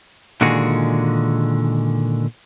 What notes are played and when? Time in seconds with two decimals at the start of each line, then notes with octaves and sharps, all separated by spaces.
0.41 A#2 D3 D#3 G#3 F#4 G#4